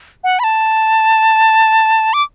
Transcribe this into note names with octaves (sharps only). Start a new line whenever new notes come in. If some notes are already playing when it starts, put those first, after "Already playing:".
F#5
B5
A5
D6